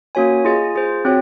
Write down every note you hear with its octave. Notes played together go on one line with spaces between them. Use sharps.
A#3 C#4 F#4 C#5 G#5
F4 G#4 D#5 G#5
F4 G#4 C5
C4 F#4 C#5